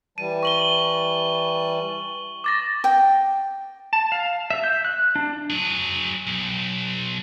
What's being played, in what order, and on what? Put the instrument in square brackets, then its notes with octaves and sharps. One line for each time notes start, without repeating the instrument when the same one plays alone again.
[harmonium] E3 G3 A5 [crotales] D#7
[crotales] C#6 F#7 G7
D6 A6 A#6
[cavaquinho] G5
[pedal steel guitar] A5
F5
E5
G6
F#6
D4
[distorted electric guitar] F#3 G#4
B1